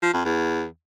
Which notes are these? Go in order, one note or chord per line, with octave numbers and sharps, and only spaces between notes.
F3
F2
E2